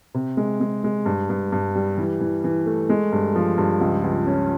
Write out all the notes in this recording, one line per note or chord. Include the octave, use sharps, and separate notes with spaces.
C3
G#3
G#3
G#3
G2
G2
G2
G3
E3
E3
E3
A3
G#3
G2
F3
G2
C#2
C#2
C#4